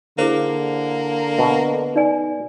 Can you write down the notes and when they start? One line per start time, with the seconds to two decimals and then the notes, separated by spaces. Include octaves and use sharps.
0.19 D3 A#3 E4 G#4 C5
1.39 B2
1.96 D#4 D5 G#5